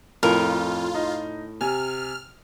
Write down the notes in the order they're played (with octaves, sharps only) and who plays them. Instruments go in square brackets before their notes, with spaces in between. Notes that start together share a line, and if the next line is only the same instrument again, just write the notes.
[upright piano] F2 [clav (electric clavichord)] A2 [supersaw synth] F4 [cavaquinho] A#4
[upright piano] D#4
[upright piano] C3 G#5 [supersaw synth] F6